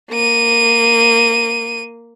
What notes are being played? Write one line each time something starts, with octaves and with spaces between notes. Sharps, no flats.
A#3 D#7